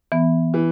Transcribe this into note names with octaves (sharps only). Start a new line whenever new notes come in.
E3 B3
E3